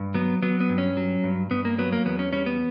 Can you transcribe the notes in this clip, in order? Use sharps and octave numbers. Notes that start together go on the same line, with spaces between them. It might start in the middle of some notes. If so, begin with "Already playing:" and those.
Already playing: G2
F#3 B3
F#3 B3
B3
G2
C#4
F#3
G2
G2 B3
A#3
F#3 B3
A#3
E2 B3
C#4
G3 C#4
B3